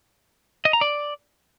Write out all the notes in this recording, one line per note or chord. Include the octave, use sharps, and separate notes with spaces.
D#5
A#5
D5